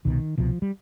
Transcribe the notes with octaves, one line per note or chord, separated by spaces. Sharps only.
C2 B2 D#3
C2 B2 F3
G3